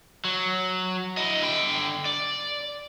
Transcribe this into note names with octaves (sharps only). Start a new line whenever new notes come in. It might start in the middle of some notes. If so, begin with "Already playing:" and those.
F#3
E4 D#5
D3 G5
D5